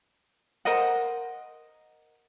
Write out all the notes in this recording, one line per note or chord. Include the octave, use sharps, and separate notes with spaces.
A#4 C5 D#5 F#5